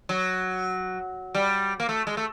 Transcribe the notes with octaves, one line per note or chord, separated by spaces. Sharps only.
F#3
G3
A#3
A3
G#3
A3